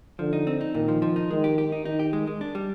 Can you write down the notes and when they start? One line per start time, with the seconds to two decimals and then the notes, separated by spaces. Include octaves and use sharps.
0.19 D3 F3
0.33 D#4
0.47 C4
0.61 D#4
0.74 A#2 D#3
0.88 F3
1.02 F3
1.16 D#4
1.30 D#3 G#3
1.44 G4
1.58 G4
1.72 D#4
1.86 D#3 D#4
1.99 G4
2.13 G#3
2.27 G#3
2.41 D4
2.55 G3